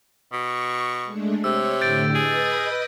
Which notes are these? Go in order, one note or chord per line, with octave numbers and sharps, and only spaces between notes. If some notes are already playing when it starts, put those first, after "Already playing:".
B2 C#6
G#3 A3 D4
C3 C#5 E6
A2 D3 G4 G6 A6 D7
G#4 B4 D#5 D#6
A6